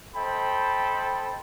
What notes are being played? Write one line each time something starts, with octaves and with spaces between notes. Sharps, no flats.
A4 C5 D#5 G5 B5